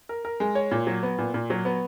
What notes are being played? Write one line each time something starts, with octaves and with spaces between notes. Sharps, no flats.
A#4
A#4
G#3
C#5
A#2
F#3
B3
A#2
A#2
F#3
B3